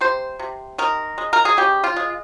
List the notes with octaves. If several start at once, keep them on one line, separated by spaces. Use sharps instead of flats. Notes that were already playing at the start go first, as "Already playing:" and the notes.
C3 C5
C3
D#3 A#4
G#3
A#4
G#4
C#3 G4
F4
G#3